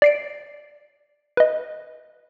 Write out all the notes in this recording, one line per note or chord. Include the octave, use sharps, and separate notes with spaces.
D5 C7 D7
B4 D#5